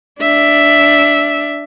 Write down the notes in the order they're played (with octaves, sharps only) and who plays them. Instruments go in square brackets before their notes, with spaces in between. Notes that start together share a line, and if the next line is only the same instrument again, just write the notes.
[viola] D4 E5